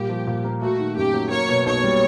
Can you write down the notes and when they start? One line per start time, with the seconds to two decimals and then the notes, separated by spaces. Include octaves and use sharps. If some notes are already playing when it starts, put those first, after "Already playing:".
Already playing: A#2 G3 G4
0.09 F3
0.27 A#2
0.44 A#3
0.61 A3 F#4
0.79 D#3
0.97 F#2 G4
1.14 F#3
1.31 A#3 C#5
1.49 B2
1.66 B1 C#5
1.84 G3